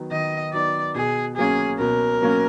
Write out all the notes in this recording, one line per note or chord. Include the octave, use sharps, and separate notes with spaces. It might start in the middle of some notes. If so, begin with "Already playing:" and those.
Already playing: D#3 F#3 B3 D#4
D#3 D#5
F#3 B3 D#4 D5
B2 G#4
F#3 A#3 C#4 G#4
B2 A#4
F#3 A#3 C#4